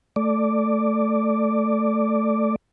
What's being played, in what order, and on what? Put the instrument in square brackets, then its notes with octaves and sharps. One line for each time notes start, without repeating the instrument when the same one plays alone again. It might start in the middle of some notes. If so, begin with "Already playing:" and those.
[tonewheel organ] A3 D5